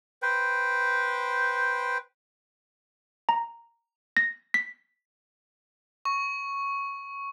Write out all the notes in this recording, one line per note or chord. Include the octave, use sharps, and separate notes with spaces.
B4 C5 G5
A#5
A#6
B6
C#6